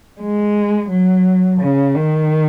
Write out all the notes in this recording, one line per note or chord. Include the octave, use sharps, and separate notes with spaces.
G#3
F#3
C#3
D#3